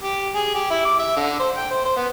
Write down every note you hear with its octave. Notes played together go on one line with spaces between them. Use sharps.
G4
G#4
G4
E4
D6
E5
D3
C5
G5
C5
C5
B3